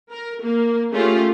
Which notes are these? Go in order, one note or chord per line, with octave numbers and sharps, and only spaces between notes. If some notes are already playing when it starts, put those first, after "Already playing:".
A#4
A#3
A3 C#4 F4 G4 G#4